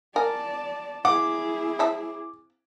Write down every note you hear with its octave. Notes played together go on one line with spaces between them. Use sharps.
A#4 D5 G#5 A5
E4 G#4 F#5 D6
C4 E5 A5